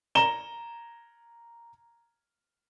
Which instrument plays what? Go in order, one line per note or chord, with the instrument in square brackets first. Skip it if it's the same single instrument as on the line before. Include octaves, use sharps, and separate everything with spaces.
[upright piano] A#5 E7 G7